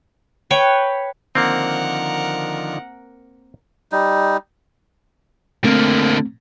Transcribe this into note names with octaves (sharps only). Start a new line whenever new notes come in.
B4 C#5 G5
D3 D#3 F3 A#3 C4 A#4 F#5
G3 D#4
D3 A3 A#3 C4